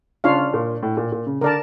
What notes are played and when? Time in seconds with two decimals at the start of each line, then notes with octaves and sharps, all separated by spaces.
0.24 C#3 D4 F4 C#5 F5
0.54 A#2
0.83 A2
0.97 A#2
1.12 A#2
1.26 C#3
1.41 D3 A#4 D5 A5